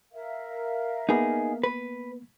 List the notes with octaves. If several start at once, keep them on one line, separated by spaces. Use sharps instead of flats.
A#4 E5 F5
A#3 B3 D#4 G#4
B4